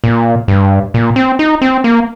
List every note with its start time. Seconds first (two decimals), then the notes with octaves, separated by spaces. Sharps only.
0.04 A#2
0.48 G2
0.94 A#2
1.16 C4
1.39 D#4
1.62 C4
1.84 A#3